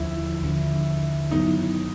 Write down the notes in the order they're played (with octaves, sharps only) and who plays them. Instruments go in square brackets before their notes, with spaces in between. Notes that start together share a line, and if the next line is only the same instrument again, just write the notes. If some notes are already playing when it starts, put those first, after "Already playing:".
Already playing: [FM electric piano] D#2 D3 F3 [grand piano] E4
[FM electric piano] D#2 D3 F3
[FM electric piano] G2 D#3 F#3 B3 E4 [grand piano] D#4